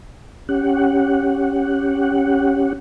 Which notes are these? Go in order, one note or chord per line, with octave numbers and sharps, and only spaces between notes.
C#4 G4 F#5